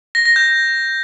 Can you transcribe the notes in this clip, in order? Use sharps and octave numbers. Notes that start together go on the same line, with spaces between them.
A#6
A#6
G6